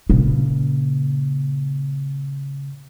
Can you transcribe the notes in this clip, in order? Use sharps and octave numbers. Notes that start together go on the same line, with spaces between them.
A#2 C#3